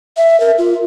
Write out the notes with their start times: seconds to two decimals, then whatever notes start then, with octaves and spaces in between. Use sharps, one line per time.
0.17 E5
0.40 A#4
0.58 F4